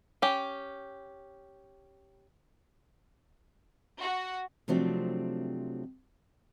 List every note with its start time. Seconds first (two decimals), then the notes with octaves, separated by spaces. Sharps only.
0.22 C#4 G4
3.99 F#4
4.68 C3 F3 F#3 A3 C4 D4